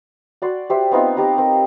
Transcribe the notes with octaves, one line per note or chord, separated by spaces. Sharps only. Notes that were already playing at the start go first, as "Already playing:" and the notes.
F#4 D5 C6
G4 C5 E5
B3 C4 D#4 F4
D#4 G4 A#5 D6
C4 A#4